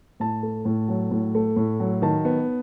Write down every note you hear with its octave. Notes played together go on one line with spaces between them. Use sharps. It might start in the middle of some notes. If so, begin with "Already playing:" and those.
A2 A5
A3
A2
F#3
A2
A3
A2
F#3
D#3 A5
B3